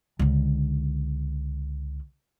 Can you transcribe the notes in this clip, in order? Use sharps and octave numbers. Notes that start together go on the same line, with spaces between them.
C#2 D3